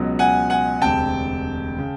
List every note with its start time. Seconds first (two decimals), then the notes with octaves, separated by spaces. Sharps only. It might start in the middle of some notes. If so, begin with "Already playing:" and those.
Already playing: C#2 B2 F#3
0.19 F#5 G#5
0.50 F#5 G#5
0.82 E1 D2 C3 G5 A5
1.78 C#3